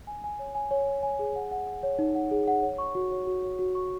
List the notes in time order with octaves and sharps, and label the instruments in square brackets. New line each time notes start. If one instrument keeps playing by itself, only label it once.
[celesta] G#5
G#5
C#5
G#5
C#5
G#5
G#5
G#4
F#5
F#5
F#5
C#5
D#4
F#5
G#4
F#5
C#5
C#6
F#4
C#5
F#4
C#5
F#4
C#6